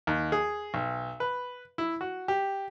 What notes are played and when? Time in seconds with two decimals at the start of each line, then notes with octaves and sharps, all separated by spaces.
0.07 D#2
0.32 G#4
0.74 B1
1.20 B4
1.78 E4
2.01 F#4
2.28 G4